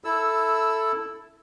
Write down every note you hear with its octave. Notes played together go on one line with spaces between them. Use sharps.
E4 A4 E6